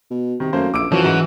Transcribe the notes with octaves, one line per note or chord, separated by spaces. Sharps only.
B2
C3 D#3
F#2 A3 A#3 C5
A#1 D6 E6 D7
F#2 E3 F3 C#4 F#4
G#2 F#4